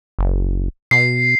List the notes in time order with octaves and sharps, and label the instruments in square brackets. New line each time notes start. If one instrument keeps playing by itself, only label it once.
[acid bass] F#1
[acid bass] B2 [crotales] C7